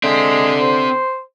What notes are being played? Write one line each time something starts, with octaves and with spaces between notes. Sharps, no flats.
D3 G#3 C4 E5
C5